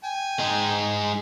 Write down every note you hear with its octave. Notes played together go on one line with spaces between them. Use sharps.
G5 G#5
G#3 D#4